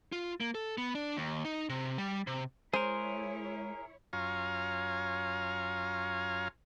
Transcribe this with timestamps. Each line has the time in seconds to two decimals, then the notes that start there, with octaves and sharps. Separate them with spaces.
0.12 F4
0.40 A#3
0.55 A4
0.78 B3
0.95 D4
1.17 D#2
1.45 D#4
1.69 C3
1.98 G3
2.27 C3
2.73 G#3 E4 G#4 A#4 C5 C#5
4.13 F#2 F4 C#5 F5 G#5 A#5